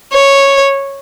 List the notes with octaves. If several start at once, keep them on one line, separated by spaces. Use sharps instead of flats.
C#5